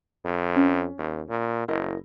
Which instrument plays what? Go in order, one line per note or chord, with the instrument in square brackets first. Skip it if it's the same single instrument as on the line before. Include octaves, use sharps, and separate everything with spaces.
[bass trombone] F2
[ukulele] C#4
[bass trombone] D#2
A#2
[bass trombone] F#1 [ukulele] E4 A#4 D#5